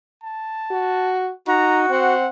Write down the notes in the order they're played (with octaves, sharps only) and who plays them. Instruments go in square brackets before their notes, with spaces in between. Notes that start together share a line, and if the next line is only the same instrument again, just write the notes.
[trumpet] A5
[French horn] F#4
[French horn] D#4 [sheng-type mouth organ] F#4 [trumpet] A#5
[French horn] C4 [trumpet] F#5